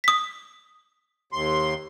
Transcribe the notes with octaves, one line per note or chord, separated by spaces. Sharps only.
D#6 B6
D#2 C6